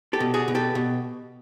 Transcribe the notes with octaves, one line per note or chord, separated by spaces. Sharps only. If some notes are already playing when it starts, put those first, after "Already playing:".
G4 A4
B2
F#4 G#4
B2
G4 A4
B2